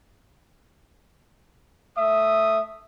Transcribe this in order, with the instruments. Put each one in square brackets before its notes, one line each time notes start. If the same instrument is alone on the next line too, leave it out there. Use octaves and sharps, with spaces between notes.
[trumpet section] A3 E5 D#6